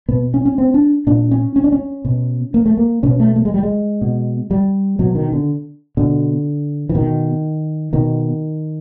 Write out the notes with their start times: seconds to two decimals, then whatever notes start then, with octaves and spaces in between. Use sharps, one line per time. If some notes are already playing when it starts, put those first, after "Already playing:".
0.08 B2 B3
0.34 C#4
0.45 C#4
0.58 C4
0.74 D4
1.07 A#2 D4
1.31 C#4
1.56 C#4
1.64 D4
1.72 C#4
2.05 B2
2.54 A#3
2.66 A3
2.77 A#3
3.03 B2 C#4
3.19 A3
3.36 A3
3.45 G#3
3.54 G3
3.63 G#3
4.01 B2
4.51 G3
4.99 B2 F#3
5.15 D#3
5.32 D3
5.97 B2 D3
6.89 E3
6.95 B2 D#3
7.93 B2 D#3